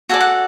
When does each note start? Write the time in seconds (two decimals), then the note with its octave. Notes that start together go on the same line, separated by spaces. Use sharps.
0.09 F#4 A4 D5 G#5
0.21 F#5